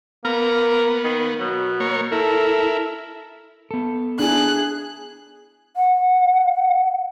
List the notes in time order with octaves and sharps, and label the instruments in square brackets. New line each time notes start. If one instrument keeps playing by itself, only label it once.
[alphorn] A#3 [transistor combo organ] B3 [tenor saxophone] A#4
[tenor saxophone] D#3
[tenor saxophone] B2 [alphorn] F#3
[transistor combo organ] A#3 C#5
[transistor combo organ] E4 [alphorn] A4 [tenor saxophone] A#4
[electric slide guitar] B3 A4
[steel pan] D4 E4 [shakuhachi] G#4 [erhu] F#6
[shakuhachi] F#5